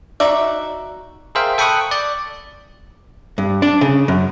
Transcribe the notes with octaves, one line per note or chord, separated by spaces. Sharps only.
D#4 F#4 D5 E5
G#4 A#4 C5 E5 F5 G5
A4 G5 B5 C#6 D#6 F#6
D5
G2
D4
C#3
F#2